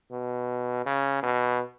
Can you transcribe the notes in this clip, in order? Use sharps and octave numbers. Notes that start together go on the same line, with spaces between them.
B2
C#3
B2